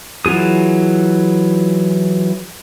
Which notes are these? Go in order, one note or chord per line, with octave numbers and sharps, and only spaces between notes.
E3 F#3 F4 G#4 D#6